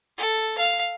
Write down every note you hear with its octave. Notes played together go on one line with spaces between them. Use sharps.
A4
F5